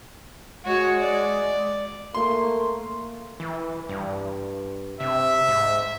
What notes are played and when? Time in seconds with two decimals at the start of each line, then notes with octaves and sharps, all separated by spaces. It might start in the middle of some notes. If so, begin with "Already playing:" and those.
0.65 G#3 F#4 C#5
0.99 D5
2.14 A3 A#3 C6
3.40 E3
3.89 G2
5.00 C3 E5
5.48 G#2